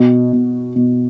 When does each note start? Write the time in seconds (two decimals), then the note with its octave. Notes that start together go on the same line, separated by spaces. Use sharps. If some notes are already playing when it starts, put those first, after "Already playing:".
Already playing: B2 F#4
0.33 B2
0.75 B2